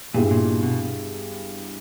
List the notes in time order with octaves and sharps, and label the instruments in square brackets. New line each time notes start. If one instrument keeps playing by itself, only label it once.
[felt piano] G2 G3 B3 E4 G#4 [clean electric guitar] A#2
[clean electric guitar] A#2
B2